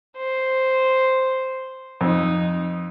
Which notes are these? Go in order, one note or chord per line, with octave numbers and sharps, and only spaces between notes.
C5
F2 D#4